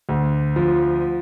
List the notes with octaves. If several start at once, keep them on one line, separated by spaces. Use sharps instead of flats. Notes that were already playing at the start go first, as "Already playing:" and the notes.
D2
F3